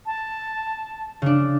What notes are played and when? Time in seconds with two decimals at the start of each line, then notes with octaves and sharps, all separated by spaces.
0.06 A5
1.22 C#3 D4